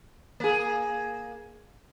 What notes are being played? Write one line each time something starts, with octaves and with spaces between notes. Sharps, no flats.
A#3 G#4